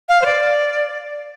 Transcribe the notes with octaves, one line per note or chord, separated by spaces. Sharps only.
F5
C5
D5